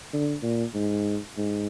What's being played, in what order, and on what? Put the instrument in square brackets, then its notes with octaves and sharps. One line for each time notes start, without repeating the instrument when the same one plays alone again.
[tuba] D3
A#2
G#2
G#2